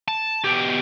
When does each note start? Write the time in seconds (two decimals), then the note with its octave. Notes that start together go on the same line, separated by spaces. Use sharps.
0.08 A5
0.44 B2 G4